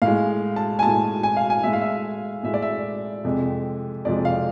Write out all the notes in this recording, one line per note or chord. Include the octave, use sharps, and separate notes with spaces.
A2 G#3 F5
A5
G#5
A2 G#3 A5
G#5
F5
G#5
A2 G#3 E5
F5
E5
A2 G#3 E5
D5
E5
F2 C3 F3 G#3
F2 C3 F3 G#3 D5
F5